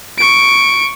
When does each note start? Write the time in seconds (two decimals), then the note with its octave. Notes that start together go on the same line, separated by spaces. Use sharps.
0.18 C#6 D7